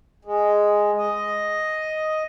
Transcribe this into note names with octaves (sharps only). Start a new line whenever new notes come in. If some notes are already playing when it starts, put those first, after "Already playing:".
G#3
D#5